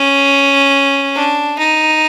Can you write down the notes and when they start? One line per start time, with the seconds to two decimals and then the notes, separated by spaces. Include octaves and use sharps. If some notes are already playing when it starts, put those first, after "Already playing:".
Already playing: C#4
1.15 D4
1.58 D#4